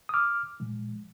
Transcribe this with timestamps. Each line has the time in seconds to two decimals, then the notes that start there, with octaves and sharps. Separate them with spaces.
0.09 D#6
0.14 D6 F6
0.60 A#2 F3 G#3